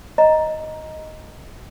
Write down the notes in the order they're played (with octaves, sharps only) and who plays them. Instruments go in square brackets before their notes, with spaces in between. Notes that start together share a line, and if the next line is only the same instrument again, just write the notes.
[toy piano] D#5 A#5